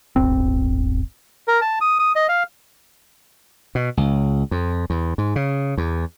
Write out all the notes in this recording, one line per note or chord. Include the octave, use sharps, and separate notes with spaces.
D1 G1 C4
A#4
A5
D#6
D#6
D#5
F5
B2
C#2
F2
E2
G#2
C#3
E2